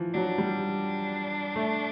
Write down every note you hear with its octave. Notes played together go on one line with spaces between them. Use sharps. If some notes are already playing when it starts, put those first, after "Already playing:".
Already playing: E3 F3
F#3 D4
G3
A3